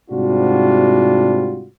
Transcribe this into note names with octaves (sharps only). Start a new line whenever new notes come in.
G#2 C3 G3 D4 F4 F#4